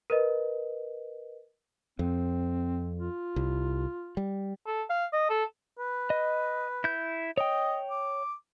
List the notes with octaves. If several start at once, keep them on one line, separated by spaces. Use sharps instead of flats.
A#4 B4 D#5
F2 C4
F4
C2
G3
A4
F5
D#5
A4
B4
D#5
E4 G6
C#5 D#5 G5
D6